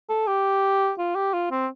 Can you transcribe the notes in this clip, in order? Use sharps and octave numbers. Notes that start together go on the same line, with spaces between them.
A4
G4
F4
G4
F4
C4